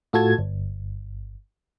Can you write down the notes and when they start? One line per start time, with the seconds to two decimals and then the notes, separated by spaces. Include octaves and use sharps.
0.13 A2 F4 F#4 A4 A5 G#6
0.38 G1